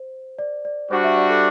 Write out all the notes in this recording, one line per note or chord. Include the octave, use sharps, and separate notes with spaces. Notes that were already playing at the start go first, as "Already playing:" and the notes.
Already playing: C5
D5
D5
G3 D4 F#4 C5
E5
D5
A4